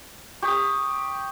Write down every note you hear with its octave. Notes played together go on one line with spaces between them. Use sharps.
G4 C#6 D#6